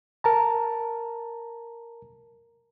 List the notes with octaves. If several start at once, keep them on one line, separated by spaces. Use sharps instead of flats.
A#4 A5 A#5